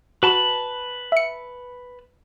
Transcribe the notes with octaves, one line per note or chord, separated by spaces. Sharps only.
F#4 B4 A5 B5
E5 C#7